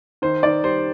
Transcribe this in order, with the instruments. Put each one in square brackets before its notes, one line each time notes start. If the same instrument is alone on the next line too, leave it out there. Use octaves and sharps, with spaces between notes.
[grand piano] D#3 C5
D#3 D5
G3 C5